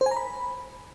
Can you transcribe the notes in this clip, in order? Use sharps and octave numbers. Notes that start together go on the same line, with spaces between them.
C5
G#5
A#5
B5